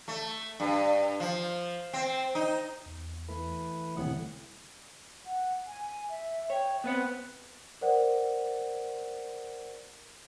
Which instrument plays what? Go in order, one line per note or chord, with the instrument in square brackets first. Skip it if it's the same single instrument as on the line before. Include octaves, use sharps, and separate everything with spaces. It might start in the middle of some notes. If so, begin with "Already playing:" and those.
[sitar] A3
G2
F3
C4
D#4
[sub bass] E2
[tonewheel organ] E3 A3 B4
[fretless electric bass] E1 C2 A2 [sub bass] D3 [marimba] D#3 A3 [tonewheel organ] F#5
[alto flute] F#5
G#5
E5
[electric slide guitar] C#5 [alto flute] G5
[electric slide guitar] B3 B4 F#5 [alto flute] C4
[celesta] A#4 C5 D5 F#5